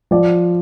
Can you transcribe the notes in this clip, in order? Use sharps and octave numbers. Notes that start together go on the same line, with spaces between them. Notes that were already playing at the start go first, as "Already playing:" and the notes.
F3 D5